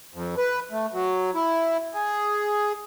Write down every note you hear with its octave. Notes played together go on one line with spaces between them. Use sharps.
F2
B4
A3
F#3
E4
G#4